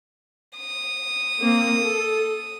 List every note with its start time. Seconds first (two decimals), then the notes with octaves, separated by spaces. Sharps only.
0.57 D#6
1.40 A#3 C4
1.81 A4